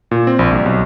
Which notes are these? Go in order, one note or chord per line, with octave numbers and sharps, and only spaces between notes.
A#2
C4
A#1
C2
B1